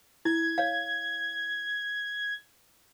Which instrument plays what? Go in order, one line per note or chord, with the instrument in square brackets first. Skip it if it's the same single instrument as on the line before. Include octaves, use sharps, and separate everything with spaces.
[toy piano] E4 [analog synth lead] G#6
[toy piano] C#5 F5